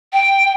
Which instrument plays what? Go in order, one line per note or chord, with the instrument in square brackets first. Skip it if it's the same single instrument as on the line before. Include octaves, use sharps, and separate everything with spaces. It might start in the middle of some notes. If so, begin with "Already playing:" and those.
[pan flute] G5